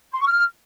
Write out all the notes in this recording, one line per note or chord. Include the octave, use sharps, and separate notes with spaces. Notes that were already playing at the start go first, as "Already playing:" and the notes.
C6
C#6
F6